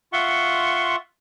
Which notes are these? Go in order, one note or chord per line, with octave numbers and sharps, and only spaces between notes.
F4 E5 F#5 C6 C#6